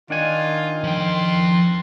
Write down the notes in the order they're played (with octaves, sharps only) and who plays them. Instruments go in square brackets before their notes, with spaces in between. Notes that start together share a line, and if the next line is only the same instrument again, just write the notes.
[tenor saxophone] D#3 [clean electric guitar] D4 F#5 G#5 [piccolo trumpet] F4
[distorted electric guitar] F3 G5 [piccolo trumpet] C6